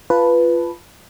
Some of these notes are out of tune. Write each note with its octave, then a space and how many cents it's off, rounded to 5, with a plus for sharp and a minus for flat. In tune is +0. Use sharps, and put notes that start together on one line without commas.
F4 -15 B4 +0 A5 +0